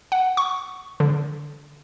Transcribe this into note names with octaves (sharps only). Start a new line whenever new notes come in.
F#5
C#6
D3